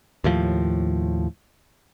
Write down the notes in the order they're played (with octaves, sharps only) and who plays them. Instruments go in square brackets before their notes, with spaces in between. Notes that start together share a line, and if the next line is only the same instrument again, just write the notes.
[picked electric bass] D#2 A2 F3